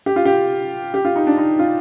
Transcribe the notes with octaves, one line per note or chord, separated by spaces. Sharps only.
G4
F4
G4
G4
F4
D#4
D4
D#4
F4